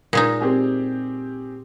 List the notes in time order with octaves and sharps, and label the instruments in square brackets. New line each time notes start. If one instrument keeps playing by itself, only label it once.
[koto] A#2 G#3 D#4
[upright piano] C4 G4 G#4